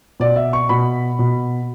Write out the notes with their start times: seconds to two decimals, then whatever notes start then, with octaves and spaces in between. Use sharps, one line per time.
0.20 B2 D5
0.36 E5
0.53 C#6
0.69 B2 B5
1.19 B2